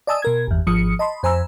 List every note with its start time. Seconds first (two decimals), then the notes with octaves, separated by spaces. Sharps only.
0.07 D5 D#5 G#5 A5 D#6 E6
0.22 B2 A#4 G#6
0.47 G1 E2
0.67 G#1 F3 D#6 C#7
0.99 D#5 A5 B5 C6
1.23 F2 C5 G#5 A#5 B5 E6